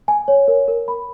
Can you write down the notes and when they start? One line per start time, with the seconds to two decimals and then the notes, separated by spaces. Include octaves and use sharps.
0.08 G#5
0.28 C#5
0.48 A#4
0.68 A#4
0.88 B5